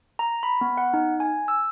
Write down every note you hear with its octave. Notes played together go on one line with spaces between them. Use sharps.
A#5
B5
B3
F#5
D#4
G#5
E6